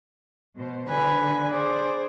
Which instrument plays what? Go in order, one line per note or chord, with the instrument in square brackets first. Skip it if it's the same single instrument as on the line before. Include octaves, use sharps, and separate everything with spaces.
[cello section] B2 C5
[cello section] D3 [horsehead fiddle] B4 [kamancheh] G#5
[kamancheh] G#4 C5 [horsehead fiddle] D5